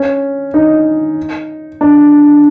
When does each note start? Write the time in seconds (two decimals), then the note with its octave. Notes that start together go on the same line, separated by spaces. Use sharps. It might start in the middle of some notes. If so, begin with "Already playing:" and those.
Already playing: C#4
0.54 D#4
1.81 D4